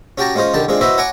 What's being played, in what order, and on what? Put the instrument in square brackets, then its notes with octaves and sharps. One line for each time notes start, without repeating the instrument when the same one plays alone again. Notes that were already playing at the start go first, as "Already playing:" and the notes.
[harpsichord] C#4 F#4 G4 G5 A5 A#5
G#3 C#4 F4 C5 D#5
C2 D3 D#3 G4 A5
G#3 C4 D4 F4 G#4
E4 F#4 B4 C5 D#5 E5
C#5 F#5 G#5 A#5 C#6 D6